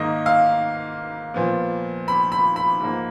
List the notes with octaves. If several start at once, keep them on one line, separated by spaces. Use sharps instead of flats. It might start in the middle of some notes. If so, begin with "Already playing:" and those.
Already playing: G#2 D#3 A#3 D#5
F5
A#2 F3 B3
B5
B5
B5
G#2 F3 A#3